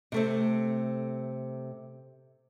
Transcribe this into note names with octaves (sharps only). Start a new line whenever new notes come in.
C3 A3 C4